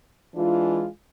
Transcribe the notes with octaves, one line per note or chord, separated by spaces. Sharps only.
E3 G#3 D4 F4